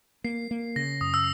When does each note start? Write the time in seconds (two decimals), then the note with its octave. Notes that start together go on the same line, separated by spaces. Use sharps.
0.24 A#3 C7
0.51 A#3
0.76 C#3 A#6
1.01 F#2 D#6
1.14 E6